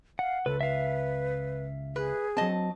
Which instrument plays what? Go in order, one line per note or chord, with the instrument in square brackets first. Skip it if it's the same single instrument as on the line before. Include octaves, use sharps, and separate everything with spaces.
[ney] F5 [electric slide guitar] F#5
[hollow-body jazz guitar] C#2 [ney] A4 [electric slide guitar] B4
[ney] B4 [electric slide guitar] E5 F5
[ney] G#4 [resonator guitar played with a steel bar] B4
[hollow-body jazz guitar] F#3 C4 [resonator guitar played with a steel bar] D#5 A5